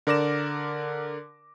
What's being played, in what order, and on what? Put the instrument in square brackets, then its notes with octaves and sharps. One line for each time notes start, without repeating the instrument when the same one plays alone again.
[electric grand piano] D3 A#4 D5 D6 A#6 E7